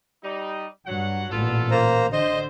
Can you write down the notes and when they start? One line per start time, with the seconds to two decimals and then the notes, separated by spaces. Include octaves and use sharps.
0.24 G3 D#4
0.87 G2 F#3 F#5
1.31 A1 A#2 B3 F4 A4
1.71 A#3 C5 A#5
2.12 D3 C5 D#5